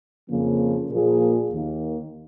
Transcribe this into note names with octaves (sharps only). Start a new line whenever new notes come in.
F2 C#3 F3 A#3
A#2 F3 A#3 F4 G#4
D#2 D#3 A#3